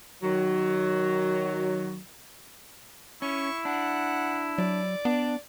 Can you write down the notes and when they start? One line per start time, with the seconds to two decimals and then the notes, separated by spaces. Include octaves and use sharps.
0.23 D#3 F#3
3.22 C#4 E4 C#6
3.65 D4 F#5
4.58 F#3 D5
5.05 B3 D4